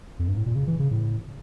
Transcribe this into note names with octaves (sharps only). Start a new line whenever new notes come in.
F2
G2
A2
A#2
C#3
E3
C#3
A2